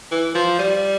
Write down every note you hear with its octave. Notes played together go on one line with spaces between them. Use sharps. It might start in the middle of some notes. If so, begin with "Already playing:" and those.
E3
F3
G3